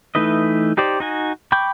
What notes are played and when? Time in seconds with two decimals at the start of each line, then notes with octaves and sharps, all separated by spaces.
0.15 E3 A3 D#4 B4 D#5
0.77 D#4 G4 C5 D5
1.00 D#4 F#4 G#5
1.52 G5 B5 C#6 D6 G6